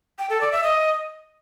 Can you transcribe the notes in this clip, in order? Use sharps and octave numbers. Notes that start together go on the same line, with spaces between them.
G5
A4
D5
E5
D#5